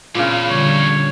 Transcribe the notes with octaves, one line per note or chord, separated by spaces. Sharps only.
E2 A#2 C#3
D3 G3 C#5